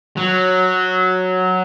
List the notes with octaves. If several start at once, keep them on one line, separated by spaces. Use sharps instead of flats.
F#3